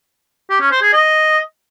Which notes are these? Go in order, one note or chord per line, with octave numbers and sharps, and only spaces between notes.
G4
C#4
C5
G#4
D#5